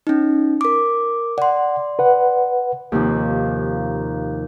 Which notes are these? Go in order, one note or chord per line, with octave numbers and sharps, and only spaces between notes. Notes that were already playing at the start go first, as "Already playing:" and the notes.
C#4 D#4
A#4 D6
D5 F#5 C6
B4 F#5
D#2 C3 F3